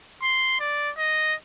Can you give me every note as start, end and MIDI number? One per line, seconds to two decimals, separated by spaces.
0.23 0.60 84
0.60 0.90 74
0.98 1.34 75